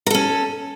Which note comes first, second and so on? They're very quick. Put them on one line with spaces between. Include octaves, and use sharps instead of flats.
A#4 A4 C#4